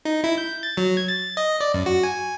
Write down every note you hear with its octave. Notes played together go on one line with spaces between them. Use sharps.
D#4
E4
G6
A6
F#3
G#6
A6
D#5
D5
F#2
F#4
G#5